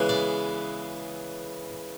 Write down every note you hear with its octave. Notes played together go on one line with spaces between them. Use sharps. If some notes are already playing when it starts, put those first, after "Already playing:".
Already playing: C#3 E3 G#3 B3
D5